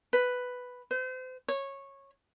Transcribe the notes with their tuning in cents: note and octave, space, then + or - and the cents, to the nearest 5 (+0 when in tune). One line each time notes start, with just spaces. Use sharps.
B4 +5
C5 -35
C#5 -15